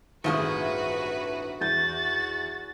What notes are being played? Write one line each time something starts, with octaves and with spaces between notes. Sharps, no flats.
G1 C2 A2 D#3 F4 F#4 G#4 B4
E2 F#4 G6 A6